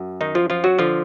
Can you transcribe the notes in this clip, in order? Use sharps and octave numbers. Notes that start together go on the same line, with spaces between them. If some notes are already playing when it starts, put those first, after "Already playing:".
Already playing: F#2
D#3 D#4
F3 F4
F3 F4
F#3 F#4
D3 F3 F4